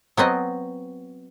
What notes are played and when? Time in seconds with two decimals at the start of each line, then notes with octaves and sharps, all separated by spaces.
0.17 F#3 B3 C4 D#5